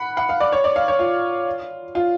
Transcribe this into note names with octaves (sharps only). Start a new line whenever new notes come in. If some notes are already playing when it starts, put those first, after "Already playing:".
Already playing: F#5 B5
F#5
F5
D5
C#5
D5
F5
C#5
F4
F4